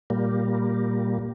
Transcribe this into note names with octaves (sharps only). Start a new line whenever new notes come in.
A#2 G3 A#3